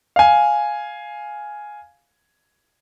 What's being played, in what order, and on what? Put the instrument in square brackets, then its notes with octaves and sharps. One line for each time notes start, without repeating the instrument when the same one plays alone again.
[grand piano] F5 G#5